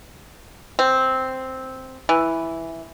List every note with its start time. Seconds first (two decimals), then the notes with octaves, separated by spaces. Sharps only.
0.79 C4
2.09 E3